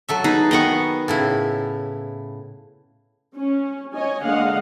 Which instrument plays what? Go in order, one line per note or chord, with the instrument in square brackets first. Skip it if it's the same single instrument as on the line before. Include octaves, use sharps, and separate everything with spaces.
[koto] F#3 A4 E5
[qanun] D#4 G#4 [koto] B4
[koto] D#3 B3 [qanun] D#5 B5 C#6
[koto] A2 C#3 E4
[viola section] C#4
C#5 D#5 G#5
D3 G#3 A#3 D#5 F5 F#5